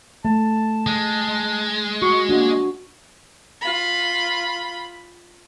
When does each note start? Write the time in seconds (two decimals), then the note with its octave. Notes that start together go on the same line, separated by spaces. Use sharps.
0.25 A3 A5
0.87 G#3
2.02 F#4 C#6
2.29 A#3 D4 F#4
3.62 F4 B5